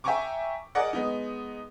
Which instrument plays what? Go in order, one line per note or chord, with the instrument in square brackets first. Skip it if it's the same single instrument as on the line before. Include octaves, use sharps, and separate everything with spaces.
[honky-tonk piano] E5 G5 G#5 A#5 C#6 D6
G#4 A#4 D5 D#5 F#5
G#3 B3 D#4